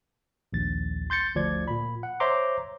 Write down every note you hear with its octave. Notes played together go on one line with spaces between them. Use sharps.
A#1 D#2 A6
C6 G6 A6 C#7
G1 D2 F3 D5 G#6
A#2 B5
F#5
C5 C#5 E5 A#5 C6 D6